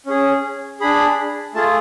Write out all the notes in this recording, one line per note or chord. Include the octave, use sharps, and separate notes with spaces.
C#4 G#4
D4 G#4 B5
A3 F4 G#4 A5